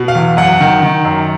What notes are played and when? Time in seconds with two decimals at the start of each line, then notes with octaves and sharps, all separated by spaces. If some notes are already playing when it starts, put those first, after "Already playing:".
Already playing: B2
0.08 F5
0.15 E2
0.37 F#2 F#5
0.61 D#3
0.83 D#3
1.05 F#2